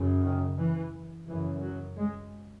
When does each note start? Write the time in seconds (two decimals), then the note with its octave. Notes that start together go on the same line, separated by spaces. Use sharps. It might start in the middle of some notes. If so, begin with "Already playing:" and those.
Already playing: F#2 C#3
0.23 D#3
0.57 E3
1.29 F#2 C#3 E3
1.63 F#3
1.98 G#3